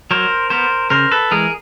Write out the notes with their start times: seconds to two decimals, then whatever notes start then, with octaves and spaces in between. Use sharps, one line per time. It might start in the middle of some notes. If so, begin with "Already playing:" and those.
0.11 F#3 A#4 C5
0.50 B3 A#4 C5
0.90 C#3 A#4 C5
1.11 A4 B4
1.31 E3 G#3 G#4 A#4